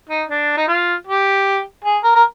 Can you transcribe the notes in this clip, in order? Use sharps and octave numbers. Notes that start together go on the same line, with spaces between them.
D#4
D4
D#4
F4
G4
G#4
A#4
A#4